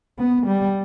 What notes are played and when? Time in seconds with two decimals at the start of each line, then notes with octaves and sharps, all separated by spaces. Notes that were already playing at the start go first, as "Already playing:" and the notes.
0.18 B3
0.47 G3